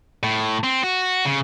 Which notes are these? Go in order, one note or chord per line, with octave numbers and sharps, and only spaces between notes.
A2
C4
F#4
C#3